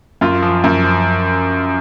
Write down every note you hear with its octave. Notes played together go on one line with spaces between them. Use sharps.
F#2 F4
F3
F#2
F3